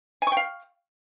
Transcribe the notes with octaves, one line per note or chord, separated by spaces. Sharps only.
F5 G5 G#5 C#6